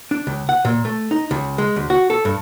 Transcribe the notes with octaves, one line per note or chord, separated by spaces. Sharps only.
D4
C#2
F#5
A#2
A3
D#4
C#2
G#3
D2
F#4
A4
G2